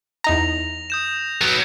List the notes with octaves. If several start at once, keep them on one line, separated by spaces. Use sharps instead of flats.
E2 D#4 A#5 A#6 F7
D#6 G6 E7
F#3 B3